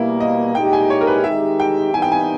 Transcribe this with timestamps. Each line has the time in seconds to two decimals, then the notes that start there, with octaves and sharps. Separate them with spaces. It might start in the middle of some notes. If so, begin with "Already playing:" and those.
Already playing: B2 G3 A#3 E4
0.20 D#5
0.55 A#2 G#3 D#4 G4 G5
0.73 G#5
0.90 C#5
1.01 A#4
1.07 B4
1.24 D#3 G#3 D#4 G4 E5
1.60 G5
1.93 E3 G3 B3 D#4 G#5
2.02 G5
2.12 G#5